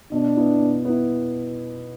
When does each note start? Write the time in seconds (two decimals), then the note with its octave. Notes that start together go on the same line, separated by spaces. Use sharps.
0.12 B2 D4
0.37 B3 E4
0.60 B2
0.85 B3 E4